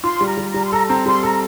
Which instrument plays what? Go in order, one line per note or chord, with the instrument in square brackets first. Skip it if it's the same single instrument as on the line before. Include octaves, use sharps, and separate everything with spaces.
[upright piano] F4 [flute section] C6
[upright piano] G3
[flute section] A#5
[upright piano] G3
[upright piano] G3 [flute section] A#5
[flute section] C6
[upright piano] A4 [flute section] A#5
[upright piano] C4 [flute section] A#5
[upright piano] G3 [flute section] C6
[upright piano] A4 [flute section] A#5